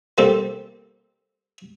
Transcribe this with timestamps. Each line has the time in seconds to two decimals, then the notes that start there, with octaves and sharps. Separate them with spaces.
0.18 G3 A#3 C4 G4 A4